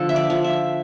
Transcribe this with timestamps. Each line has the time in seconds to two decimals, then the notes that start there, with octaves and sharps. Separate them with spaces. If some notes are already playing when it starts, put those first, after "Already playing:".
Already playing: D3 F3 A4
0.09 E5
0.16 D5
0.30 F3
0.44 E5